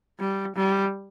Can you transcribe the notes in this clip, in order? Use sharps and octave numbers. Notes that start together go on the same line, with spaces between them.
G3
G3